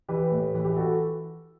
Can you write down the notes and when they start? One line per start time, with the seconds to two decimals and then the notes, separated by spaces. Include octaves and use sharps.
0.09 E3 G4 B4
0.32 A2
0.54 E3
0.65 G4
0.76 E3 F#4 A4